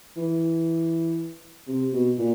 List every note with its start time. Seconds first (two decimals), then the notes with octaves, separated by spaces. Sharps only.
0.17 E3
1.68 C3
1.93 B2
2.18 A#2